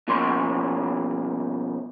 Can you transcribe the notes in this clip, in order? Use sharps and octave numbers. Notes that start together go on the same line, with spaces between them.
B2 F3 A#3 C#4 C#5 C6